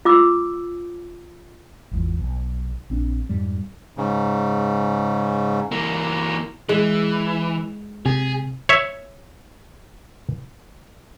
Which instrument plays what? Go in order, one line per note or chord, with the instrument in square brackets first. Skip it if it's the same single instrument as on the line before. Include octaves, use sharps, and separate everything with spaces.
[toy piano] F4 D6 E6
[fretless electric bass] G#1 E2 F3
B1
A#1 C4 D4
F2 G#2 G3
[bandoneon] G#2 C#3
[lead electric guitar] E3 A#3
[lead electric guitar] E3 [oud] G#3
[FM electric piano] C3 [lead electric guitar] G#4
[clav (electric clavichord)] C#5 E5